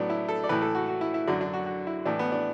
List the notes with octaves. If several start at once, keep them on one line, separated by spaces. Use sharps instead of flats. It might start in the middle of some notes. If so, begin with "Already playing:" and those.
Already playing: A2 F#3 B3 D4
E4
A4
D5
A2 E3 B4
A4
F#4
F#4
E4
E4
F#2 D3 F#3 D4
D4
F#4
F#4
E4
A2 E3 D4
B3
D4